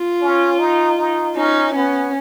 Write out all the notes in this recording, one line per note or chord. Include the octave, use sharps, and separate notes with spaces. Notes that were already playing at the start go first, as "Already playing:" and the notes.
Already playing: F4
C#4
D#4
D#4
C#4 D#4
B3 C#4